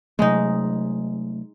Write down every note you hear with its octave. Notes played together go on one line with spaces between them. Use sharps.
C3 F#3 G#3 A3 D#4